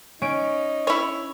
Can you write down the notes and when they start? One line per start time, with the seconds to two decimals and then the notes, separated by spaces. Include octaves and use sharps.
0.22 C#4 D#4 D7
0.87 E4 C#5